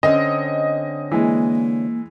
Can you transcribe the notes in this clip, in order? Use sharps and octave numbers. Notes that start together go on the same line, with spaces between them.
D3 C4 C#4 D#5
E3 G#3 A#3